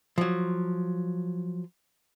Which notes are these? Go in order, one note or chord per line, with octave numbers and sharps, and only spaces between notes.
F3 F#3